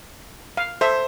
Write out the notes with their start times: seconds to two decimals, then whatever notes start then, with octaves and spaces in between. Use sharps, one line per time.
0.57 F5
0.81 A4 C5 E5